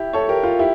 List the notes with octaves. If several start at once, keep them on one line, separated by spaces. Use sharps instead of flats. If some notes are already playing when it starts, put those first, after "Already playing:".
Already playing: E4 G4
A4 C#5
G4 A#4
F4
E4 G4